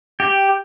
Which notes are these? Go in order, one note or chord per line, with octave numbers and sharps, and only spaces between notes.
G4